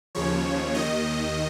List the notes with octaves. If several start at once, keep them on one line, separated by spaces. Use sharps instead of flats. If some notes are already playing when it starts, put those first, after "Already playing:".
D#2 C#3 F3 C#5
D#2 D#3 D#5